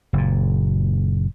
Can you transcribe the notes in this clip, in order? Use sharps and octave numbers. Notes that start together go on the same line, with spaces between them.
F#1 A#2